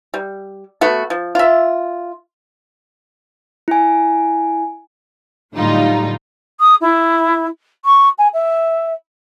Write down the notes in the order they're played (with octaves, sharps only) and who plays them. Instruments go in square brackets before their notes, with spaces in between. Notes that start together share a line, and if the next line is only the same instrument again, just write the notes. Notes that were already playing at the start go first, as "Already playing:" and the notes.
[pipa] G3
A3 B3 F#4
F3
F4 E5
[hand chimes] E4 G#5
[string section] A2 D3 F#3 G3 D#4 F4
[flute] D#6
E4
C#6
G#5
E5